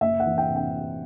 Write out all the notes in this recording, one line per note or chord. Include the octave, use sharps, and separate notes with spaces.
F#1 E5
F#5
E3
G5
C3
G5